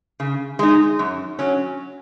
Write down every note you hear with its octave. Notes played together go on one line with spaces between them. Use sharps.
C#3
G#3 D#4
F#2
F#3 C#4